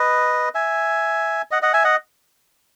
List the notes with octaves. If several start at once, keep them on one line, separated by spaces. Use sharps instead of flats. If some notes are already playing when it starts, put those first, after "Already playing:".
Already playing: B4 D#5
E5 G#5
D#5 F#5
D#5 F#5
E5 G#5
D#5 F#5